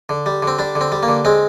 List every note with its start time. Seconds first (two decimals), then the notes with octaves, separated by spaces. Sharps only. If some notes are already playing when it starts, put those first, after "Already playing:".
0.09 D3
0.26 G3
0.42 D3 C4
0.59 G3 D4
0.75 D3
0.81 C4
0.92 G3
1.03 A#3
1.08 D3
1.25 G#3 C4